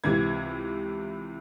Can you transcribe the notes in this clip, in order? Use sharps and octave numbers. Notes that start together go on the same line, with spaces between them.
C#2 C3 E3 G#6